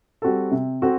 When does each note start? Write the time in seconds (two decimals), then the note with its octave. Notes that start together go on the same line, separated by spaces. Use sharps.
0.22 G3 C4 F#4 A4
0.51 C3
0.82 C4 F#4 A4